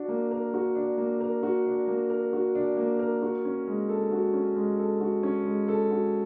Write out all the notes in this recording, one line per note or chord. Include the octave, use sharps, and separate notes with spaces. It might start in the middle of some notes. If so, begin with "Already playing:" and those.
Already playing: D4 F#4
A#3
A#4
F#4
D4
A#3
A#4
F#4
D4
A#3
A#4
F#4
D4
A#3
A#4
F#4
C#4
G#3
A4
F#4
C#4
G#3
A4
F#4
C#4
G#3
A4
F#4